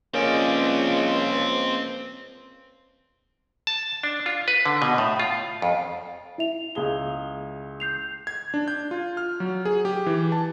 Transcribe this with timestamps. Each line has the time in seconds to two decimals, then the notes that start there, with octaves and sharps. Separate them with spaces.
0.14 C#2 F3 A#3 C4 C#4 D5 D#5
3.67 A5
4.03 D4
4.26 F4
4.48 B4
4.66 D3
4.82 B2
4.98 A2
5.20 F4
5.62 F2
6.38 E4 E5 F7
6.75 C#2 G#4 G7
7.80 G6 C7 F7
8.27 G#6
8.54 D4
8.68 G6
8.91 F4
9.17 F6
9.40 F#3
9.65 G#4
9.85 G4
10.06 E3
10.32 A5